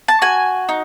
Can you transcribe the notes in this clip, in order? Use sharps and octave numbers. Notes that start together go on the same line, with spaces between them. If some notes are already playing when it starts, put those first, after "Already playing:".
A5
F#4 G#5
D#4